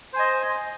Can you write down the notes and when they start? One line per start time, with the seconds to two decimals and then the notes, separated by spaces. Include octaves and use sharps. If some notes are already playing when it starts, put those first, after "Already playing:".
0.13 C5
0.16 G#5
0.19 D#5